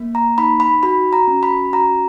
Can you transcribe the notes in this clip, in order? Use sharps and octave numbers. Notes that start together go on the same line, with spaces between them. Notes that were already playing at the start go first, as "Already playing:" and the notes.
Already playing: A#3
A#5
D#4 B5
B5
F#4 B5
A#5
C#4
B5
F#4 A#5